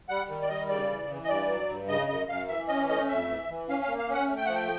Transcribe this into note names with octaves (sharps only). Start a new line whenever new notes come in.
G3 F#5
D#3
D5
G3 D#5
C#3 D5
E3
E3
D#5
G2 D5
F#3
G2
C#3 D#5
F#2 D#5
F#2 F5
E3 E5
C#4 D#5
A3 D#5
F2 E5
E3
E3
C#4 F5
F5
A#3
F5
C#4 F#5
A3
G5
F3 F#5
G5